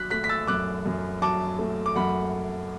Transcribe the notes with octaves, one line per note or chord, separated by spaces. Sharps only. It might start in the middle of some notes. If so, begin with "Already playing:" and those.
Already playing: F#3 F#6 B6
A3 F#6 B6
B6
E6 A6
F#2 D6 F#6
F#2
F#3 A5 D6
A3
D6
F#2 F#5 B5